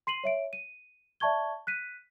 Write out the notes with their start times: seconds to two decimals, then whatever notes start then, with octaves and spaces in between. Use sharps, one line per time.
0.07 C6 C7 D#7 F#7
0.24 C#5 E5 D7
0.53 D#7
1.20 D5 E5 A5 C#6 G#6 G7
1.67 F#6 B6 D#7